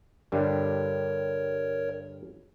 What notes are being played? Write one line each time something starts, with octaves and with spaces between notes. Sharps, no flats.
G2 D3 G3 A#4 C#5